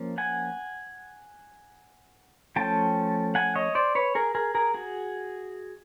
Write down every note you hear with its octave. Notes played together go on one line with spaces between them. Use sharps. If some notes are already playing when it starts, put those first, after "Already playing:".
Already playing: F3 A#3 C#4
F#5 G#5
F3 A3 C#4 G5 A5
F#5 G#5
C#5 D#5
C5 D5
B4 C#5
G#4 A#4
G#4 A#4
G#4 A#4
F#4 G#4